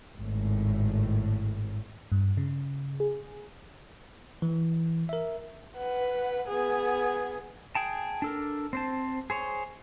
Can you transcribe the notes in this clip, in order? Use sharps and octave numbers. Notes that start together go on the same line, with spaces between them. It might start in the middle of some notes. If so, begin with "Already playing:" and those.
G#1 A2
G2
C#3
G#4
E3
A#4 E5
B4 F#5
B3 G#4
G#4 G5 A5
D4 A4 A#4
C4 C5 A5
G#4 C5 C#5